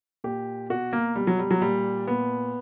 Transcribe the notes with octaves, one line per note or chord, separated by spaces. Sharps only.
A#2 G4
B2 F#4
A#3
B2 G3
F#3
G3
F#3
A#2 G3
A#2 B3